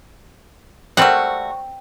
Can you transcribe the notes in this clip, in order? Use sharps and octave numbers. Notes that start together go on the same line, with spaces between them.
G3 A3 C4 F#4 F#5